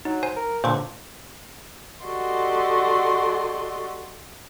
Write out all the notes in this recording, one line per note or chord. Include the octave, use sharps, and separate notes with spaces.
F#3 D#4
C5 G#5
A#4
C#2 A#2 D3 C5 C#6 D6
F#4 G4 A4 D5 D#5 C6